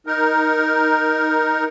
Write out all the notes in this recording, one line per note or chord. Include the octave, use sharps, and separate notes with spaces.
D#4 A#4